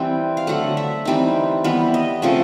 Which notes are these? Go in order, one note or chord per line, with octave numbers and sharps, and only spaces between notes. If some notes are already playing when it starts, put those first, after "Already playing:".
Already playing: E3 G3 C4 G5
F5
D3 F#3 A3 F#5
E5
E3 G3 C4 D#4
E3 G3 B3
D#5
C#3 F3 A3 C4 D#5